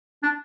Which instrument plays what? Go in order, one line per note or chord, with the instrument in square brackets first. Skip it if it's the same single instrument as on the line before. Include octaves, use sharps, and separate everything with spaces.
[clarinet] D4